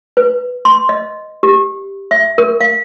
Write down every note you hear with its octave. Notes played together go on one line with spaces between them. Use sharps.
B4
C6
D#5
G4
E5
A#4
F5